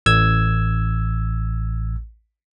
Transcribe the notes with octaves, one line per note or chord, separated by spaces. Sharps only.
A1 E6 G#6